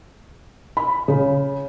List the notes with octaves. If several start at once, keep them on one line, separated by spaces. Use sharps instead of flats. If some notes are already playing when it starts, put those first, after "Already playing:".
B5
C#3